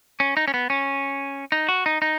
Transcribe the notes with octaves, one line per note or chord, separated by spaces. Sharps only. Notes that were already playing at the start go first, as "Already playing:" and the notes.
C#4
D#4
C#4
B3
C#4
D#4
F#4
D#4
D#4